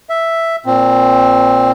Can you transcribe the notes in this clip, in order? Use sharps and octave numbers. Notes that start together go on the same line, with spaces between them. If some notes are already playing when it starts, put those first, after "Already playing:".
E5
A#2 C4